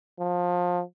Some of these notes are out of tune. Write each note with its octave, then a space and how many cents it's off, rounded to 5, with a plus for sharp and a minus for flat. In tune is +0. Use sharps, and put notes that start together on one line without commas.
F3 +25